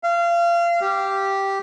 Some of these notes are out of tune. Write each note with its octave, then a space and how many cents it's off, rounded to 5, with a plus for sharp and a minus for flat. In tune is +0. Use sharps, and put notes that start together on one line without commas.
F5 -30
G4 -5